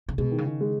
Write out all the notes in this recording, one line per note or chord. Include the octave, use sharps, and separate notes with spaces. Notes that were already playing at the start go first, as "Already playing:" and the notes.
C#3
B2 G#3
D#3
C#3
D#3
G#3